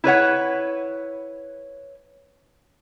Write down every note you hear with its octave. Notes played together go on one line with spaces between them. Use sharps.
E4 B4 C#5 F#5